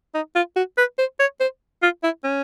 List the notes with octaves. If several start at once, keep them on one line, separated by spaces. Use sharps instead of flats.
D#4
F4
F#4
B4
C5
C#5
C5
F4
E4
C#4